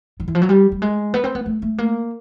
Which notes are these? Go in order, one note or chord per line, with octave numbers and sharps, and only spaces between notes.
D#3
E3
F3
F#3
G3
G3
G#3
B3
C4
B3
A3
A3
A#3